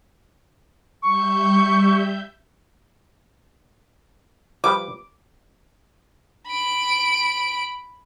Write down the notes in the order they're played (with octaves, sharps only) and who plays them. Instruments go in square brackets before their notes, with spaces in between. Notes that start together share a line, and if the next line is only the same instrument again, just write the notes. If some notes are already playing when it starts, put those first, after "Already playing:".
[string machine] G3 E5 G6 [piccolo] C#6
[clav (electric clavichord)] F3 G3 B4 [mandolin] D6
[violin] B5 D7